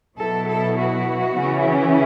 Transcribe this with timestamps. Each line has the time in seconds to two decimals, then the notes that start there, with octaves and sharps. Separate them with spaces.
0.18 B2 F#3 B3 E4 A4
0.48 A4
0.77 F#4
1.36 C#3 E3 C#4 E4